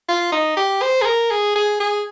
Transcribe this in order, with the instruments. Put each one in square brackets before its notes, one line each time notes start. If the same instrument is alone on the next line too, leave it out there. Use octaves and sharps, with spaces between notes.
[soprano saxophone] F4
D#4
G4
C5
G#4
A#4
G#4
G#4
G#4